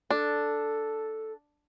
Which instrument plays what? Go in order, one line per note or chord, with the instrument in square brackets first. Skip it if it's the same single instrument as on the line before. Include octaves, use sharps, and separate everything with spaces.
[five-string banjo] D4 [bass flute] A4